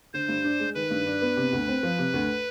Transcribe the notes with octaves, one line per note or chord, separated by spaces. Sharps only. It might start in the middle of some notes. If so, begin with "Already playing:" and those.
D3 C5
G2
D4
G#3
D#3 B4
G2
D4
B3
C3
D2
C4
F3
C3
D2